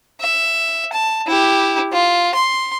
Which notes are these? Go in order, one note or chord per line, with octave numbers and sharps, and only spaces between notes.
E5
A5
E4 G4
F4
C6